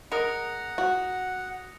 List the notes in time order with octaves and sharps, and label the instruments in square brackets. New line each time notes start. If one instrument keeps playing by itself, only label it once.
[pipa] G#3 A#4 [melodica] F#5 [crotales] D#6 A#6 C#7
[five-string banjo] F#4